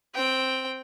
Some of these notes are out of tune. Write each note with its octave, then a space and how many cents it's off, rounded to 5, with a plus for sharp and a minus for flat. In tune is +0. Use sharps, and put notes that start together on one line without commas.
C4 +0 G5 +0